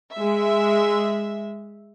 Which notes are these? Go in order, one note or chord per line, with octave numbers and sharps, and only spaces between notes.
G#3 E5